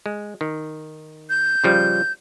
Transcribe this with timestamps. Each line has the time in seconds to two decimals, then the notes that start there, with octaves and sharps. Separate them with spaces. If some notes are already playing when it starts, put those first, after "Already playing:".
0.06 G#3
0.41 D#3
1.30 G6
1.64 C#3 F3 G3